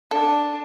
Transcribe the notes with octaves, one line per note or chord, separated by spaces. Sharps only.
D4 A4